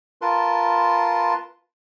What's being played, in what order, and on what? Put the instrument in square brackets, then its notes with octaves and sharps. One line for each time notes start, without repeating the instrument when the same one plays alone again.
[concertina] F4 A#4 B4 A5 C6